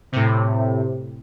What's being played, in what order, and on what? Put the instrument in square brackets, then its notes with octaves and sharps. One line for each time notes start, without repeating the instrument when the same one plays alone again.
[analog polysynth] A2 C3